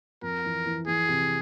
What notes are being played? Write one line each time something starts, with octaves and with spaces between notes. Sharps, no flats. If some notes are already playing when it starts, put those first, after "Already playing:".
F2 A#4
E3
E3
E3 G#4
C3